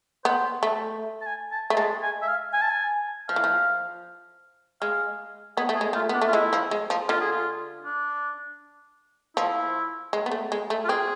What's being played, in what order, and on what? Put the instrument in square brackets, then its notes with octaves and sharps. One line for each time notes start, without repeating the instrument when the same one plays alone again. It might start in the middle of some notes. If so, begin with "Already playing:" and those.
[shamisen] B3 [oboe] C5
[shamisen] A3
[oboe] A5
G#5
A5
[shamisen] A3
[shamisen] G#3 [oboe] A5
[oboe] G#5
E5
F5
G#5
A5
G#5
[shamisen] F3 [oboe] F5
[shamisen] E3
F3
[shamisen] G#3 [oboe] F5
[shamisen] B3 [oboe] G#4
[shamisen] A3
[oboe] G#4
[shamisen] G#3
[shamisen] A3 [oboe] F4
[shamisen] B3
[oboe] D4
[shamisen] A3
[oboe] F4
[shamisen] G#3 [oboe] E4
[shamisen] F3
G#3
F3
[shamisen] D3 [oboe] F4
[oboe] G#4
F4
D4
[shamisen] F3 [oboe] E4
[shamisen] G#3
B3
A3
G#3
A3
[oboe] F4
[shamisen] C4 [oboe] G#4